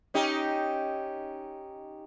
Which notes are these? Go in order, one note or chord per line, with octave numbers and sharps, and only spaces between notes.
C#4 D#4 G4